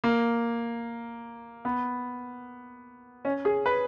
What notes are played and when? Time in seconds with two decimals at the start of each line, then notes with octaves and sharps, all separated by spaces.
0.04 A#3
1.65 B3
3.25 C#4
3.45 G#4
3.66 B4